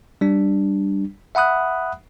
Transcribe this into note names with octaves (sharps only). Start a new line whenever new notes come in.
G3 D4
E5 F#5 B5 D#6 F#6